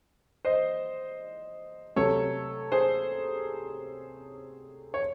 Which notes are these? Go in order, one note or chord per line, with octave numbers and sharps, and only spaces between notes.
C5 D#5
C3 F#3 A3 A4 C#5
G#4 C5
C#5